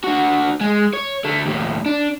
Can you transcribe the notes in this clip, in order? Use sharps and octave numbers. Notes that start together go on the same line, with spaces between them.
D3 F#4
G#3
C#5
D3 A3
D#2 A2
D4